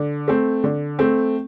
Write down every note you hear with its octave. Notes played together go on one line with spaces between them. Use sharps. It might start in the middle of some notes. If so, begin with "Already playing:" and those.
Already playing: D3
A3 C4
D3
A3 C4